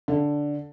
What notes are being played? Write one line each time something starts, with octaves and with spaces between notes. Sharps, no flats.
D3